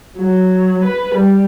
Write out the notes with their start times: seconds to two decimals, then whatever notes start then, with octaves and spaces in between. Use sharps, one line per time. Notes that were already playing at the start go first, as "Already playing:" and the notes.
0.16 F#3
0.82 B4
1.14 G3